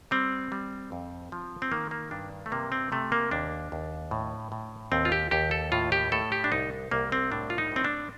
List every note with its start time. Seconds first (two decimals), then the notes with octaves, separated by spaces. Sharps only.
0.11 G3 C4
0.52 G3
0.92 F2
1.32 F3
1.62 C4
1.71 D#3 A#3
1.91 A#3
2.11 G2 D4
2.46 A3
2.52 C3 A#3
2.72 C4
2.92 C3 A3
3.12 A#3
3.31 D#2 D4
3.72 D#2
4.11 A2
4.52 A2
4.92 D#2 C4
5.05 F4
5.12 G4
5.31 D#2 G4
5.51 A4
5.72 A2 F4
5.92 G4
6.12 A2 A4
6.32 G4
6.44 D4
6.52 C2 D#4
6.91 C2 A#3
7.12 C4
7.32 A2 D4
7.50 F4
7.58 D#4
7.72 A2 C4
7.85 D4